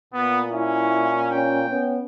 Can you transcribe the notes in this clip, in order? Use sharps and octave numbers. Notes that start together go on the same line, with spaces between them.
A#2 B3
C#4 E4
C#4 G5
B3 C#4